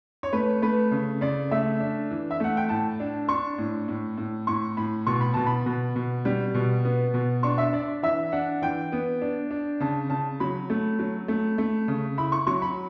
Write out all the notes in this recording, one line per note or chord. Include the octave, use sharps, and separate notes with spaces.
C#5
A3 B4
A3 B4
C#3
C#3 D5
A3 E5
D4
E3
E5
A3 F#5
G5
A2 A5
D4
D4 C#6
A2
A2
A2
A2 C#6
A2 B5
B2 C#6
B5
B2 A5
B5
B2
B2
G3
B2
B3
B2
D4 C#6
E5
D4 D5
E3 E5
D4 F#5
E3 G5
B3
D4
D4
C#3 A5
C#3 A5
F#3 B5
A3
F#3
A3
A3
C#3
E4 B5
C#6
F#3 C#6
B5